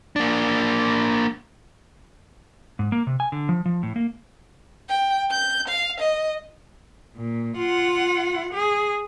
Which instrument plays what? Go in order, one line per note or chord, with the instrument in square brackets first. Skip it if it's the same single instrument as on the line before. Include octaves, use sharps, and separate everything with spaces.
[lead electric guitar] A#3 D4
[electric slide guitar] G#2
A#3
C3
G#5
D3
F3
F3
A2
A#3
[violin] G5
G6
F5
D#5
[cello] A#2
F4 F#5
G#4